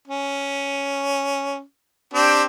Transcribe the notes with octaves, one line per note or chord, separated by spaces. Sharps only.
C#4
C4 D4 G4